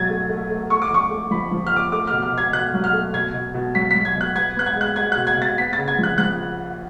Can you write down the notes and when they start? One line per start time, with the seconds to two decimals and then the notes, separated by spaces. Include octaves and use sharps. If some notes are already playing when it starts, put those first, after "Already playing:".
Already playing: B2 F#3 G#6 A6
0.10 A3
0.29 A3
0.51 A3
0.70 A3 C#6
0.82 D6
0.90 F2 C#6
1.10 A3
1.31 F3 B5
1.52 F3
1.67 F6
1.72 F2 D6
1.92 A3 D6
2.07 B2 F6
2.22 F6
2.33 B2 G#6
2.53 B2 F#6
2.74 F#3
2.84 F6
2.93 A3
3.14 B2 G#6
3.34 B2
3.54 B2
3.75 F#3 B6
3.91 F#3 B6
4.05 G#6
4.15 B2
4.21 F#6
4.35 B3 G#6
4.57 B3 F#6
4.66 G#6
4.76 G#3 F#6
4.96 G#3 G#6
5.12 B2 F#6
5.27 G#6
5.38 B2 A6
5.58 B3 B6
5.73 C#3 A6
5.88 G#6
5.98 F3
6.03 F#6
6.18 F3 F#6